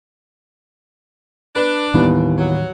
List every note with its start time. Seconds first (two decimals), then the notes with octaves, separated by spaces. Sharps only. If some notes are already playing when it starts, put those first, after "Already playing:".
1.56 D4 B4
1.94 D#2 A2 D#3 E3 G3 B3
2.38 F#3